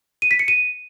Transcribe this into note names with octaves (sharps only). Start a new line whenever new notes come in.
D#7
B6
C#7
D#7